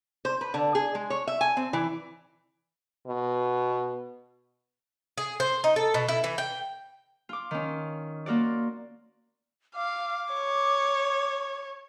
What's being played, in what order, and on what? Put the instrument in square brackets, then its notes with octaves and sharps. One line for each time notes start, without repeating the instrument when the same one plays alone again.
[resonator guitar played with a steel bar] C5
B4
D3
G#4
G#3
C#5
E5
G#5
C4
E3
[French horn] B2
[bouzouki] G#4
C5
D#4
A4
B2
E4
E3
G5
[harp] F4 D6
D#3 C#4
A#3 F4 F#4 D5
[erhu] F5 [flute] D6
[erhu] C#5